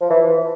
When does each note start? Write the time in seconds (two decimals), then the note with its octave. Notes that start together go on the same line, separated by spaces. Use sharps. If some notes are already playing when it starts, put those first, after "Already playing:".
0.01 F3
0.10 E3